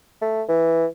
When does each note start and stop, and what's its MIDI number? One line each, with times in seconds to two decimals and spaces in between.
0.22 0.43 57
0.49 0.86 52